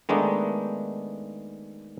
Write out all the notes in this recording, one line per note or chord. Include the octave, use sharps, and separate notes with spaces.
D#3 G#3 A3 B3 D4 D#4